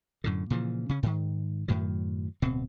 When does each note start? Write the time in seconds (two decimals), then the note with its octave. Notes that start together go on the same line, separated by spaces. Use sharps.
0.24 F#2 A2 D3
0.50 A#2 C#3 E3 F3
0.89 C#3 C#4
1.03 G#2 D#3
1.68 F#2 A2 D#3 F#3
2.42 D1 B2 C4